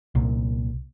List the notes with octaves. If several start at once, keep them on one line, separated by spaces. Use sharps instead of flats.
C2 A#2